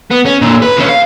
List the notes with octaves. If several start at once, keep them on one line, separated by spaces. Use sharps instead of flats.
B3
C#4
A#2 D3
B4
D3 C#4
F5